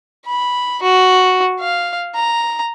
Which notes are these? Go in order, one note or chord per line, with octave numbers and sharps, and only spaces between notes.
B5
F#4
F5
A#5